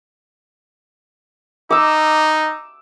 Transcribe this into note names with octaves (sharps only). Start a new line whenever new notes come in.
D#4 D6 E6